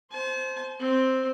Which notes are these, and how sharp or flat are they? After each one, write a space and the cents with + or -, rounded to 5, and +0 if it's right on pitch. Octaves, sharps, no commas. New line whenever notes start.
C5 +0 A5 -45
C4 +0 C5 +0